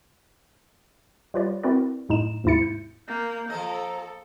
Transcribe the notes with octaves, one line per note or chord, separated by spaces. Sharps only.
G3 F4 B4 C#5 D5
C4 E4 F#4 A#4 B4 D5
F#2 A2 D#4 E7
D#2 G#2 C3 E4 A6 C#7
G6
A#3 G6
F3 A4 C5 D#5 A#5